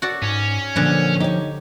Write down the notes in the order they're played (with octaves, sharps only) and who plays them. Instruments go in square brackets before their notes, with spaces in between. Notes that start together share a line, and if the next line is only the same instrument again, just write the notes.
[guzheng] F#4 A4 D5
[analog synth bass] G#2 [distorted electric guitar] C#4
[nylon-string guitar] A#2 [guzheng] D3 F#3 [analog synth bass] F3
[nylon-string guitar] D#4 C#5 [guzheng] G4